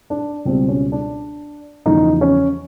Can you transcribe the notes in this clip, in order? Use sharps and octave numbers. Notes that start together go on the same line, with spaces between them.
D4
C#2 B2 G3 C4
C#4
D4
E2 C#3 F3 A3 D#4
C#4